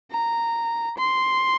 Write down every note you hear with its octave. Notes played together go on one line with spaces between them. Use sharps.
A#5
C6